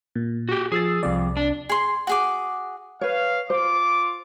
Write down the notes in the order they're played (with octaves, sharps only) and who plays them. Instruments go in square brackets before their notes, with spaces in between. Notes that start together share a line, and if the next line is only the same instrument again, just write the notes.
[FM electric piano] A#2
[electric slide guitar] F#4 G4
[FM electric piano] F3 E6 A6 [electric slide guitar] G#4
[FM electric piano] C2 C3 D5 [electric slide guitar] F2
[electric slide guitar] D4
[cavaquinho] G#4 C6
F#4 G#4 D6
[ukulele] B4 C#5 [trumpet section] F5
[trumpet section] F4 D6 [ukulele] C5